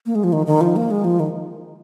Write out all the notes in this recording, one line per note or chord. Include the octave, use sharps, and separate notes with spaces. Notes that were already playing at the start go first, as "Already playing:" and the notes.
A#3
G#3
F3
D#3
D#3
F3
A#3
G#3
F3
D#3